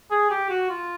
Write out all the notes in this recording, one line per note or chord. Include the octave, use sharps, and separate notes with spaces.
G#4
G4
F#4
F4